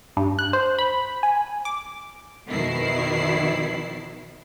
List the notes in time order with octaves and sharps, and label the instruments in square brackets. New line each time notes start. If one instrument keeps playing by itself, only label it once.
[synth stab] G2
F#6
C5
B5
G#5
D6
[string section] F2 B2 D#3 E4 C7